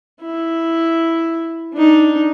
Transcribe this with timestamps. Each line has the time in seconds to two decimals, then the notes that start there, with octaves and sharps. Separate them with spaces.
0.22 E4
1.73 D4 D#4